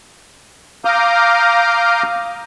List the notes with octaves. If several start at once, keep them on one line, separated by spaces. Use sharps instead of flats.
F5 A#5 D6 D#6 F6 G6